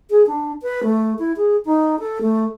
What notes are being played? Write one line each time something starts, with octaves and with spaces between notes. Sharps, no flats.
G#4
D4
B4
A3
E4
G#4
D#4
A4
A3